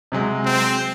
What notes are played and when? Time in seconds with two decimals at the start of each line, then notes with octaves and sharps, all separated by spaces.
0.12 C3 F#3 G#3
0.45 C4